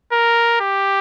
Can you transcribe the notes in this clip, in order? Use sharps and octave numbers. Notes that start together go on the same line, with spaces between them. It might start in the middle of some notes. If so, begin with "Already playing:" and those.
A#4
G4